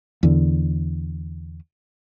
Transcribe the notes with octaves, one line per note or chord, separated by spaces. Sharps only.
E2 D3